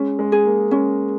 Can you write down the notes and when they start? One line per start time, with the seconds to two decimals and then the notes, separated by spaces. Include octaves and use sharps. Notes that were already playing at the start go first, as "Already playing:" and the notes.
Already playing: G#3 C#4
0.19 G#3
0.32 G#4
0.45 A#3
0.71 G#3 C#4